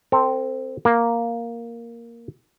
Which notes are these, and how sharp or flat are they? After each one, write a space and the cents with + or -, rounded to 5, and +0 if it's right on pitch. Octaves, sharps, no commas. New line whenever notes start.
C4 +0 A4 +45
A#3 +0 A#4 +0